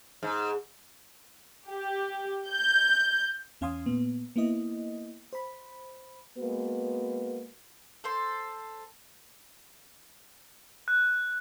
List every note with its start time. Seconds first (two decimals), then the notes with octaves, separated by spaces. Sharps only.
0.23 G#2
1.68 G4
2.50 G6
3.61 E2 C#4 F5 G#5 C6 D#6
3.86 A#2 B3
4.36 A#3 B3 E4 D#5
5.33 C5 B5
6.38 G#3 A#3 B3 F#4 B4
8.04 A4 C5 C6
10.88 F#6